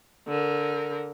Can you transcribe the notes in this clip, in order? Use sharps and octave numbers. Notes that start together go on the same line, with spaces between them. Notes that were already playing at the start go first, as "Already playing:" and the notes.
D3 A#4